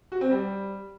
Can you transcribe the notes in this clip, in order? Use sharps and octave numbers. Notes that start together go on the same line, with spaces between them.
F#4
C4
G3